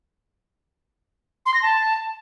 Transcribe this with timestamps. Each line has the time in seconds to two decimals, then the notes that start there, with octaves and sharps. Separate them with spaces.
1.46 C6
1.54 A#6
1.62 A5